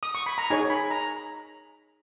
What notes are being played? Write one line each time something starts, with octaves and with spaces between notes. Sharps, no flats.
D#6
C#6
B5
A#5
D#4 G#4 C#5 G#5
B5
A#5